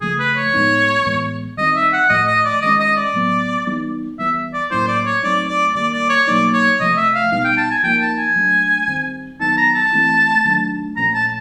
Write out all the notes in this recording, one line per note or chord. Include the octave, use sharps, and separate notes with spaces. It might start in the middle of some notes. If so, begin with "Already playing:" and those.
C#3 F3 A3 G#4
B4
C#5
A2 F3 G#3 B3 D#4
A2 E3 G#3 B3
D#3 G3 C4 D#4 D#5
E5
F#5
A2 F3 A3 D#5
D#5
D5
D#3 G#3 C#4 D#5
D#5
D5
A2 F#3 B3
E3 G3 B3 D#4
E3 G3 B3 E5
D5
A2 F#3 A#3 C#4 E4 C5
D5
C#5
F#3 A3 C4 D#4 D5
D5
D#3 G3 A#3 D5
D5
C#5
B2 F#3 A#3 D#4 D5
C#5
C3 F3 A3 D#5
E5
F5
B2 G3 B3 D#4 F5
G5
A5
G#5
F3 A#3 D#4 G5
A5
G#5
F#3 A3 D4
D#3 G3 C4
D#3 F#3 B3 D#4 A5
A#5
A5
E3 A3 C4 E4
D#3 F#3 A3 D4
A#2 F3 A3 C#4 A#5
A5